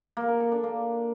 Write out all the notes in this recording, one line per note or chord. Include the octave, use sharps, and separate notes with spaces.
A#3
A#4
A4
D4
A#3